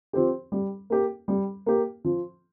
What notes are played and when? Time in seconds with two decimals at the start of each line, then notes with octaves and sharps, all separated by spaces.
0.13 F3 C4 G4
0.52 G3
0.90 A#3 G4
1.28 G3
1.66 A#3 G4
2.05 F3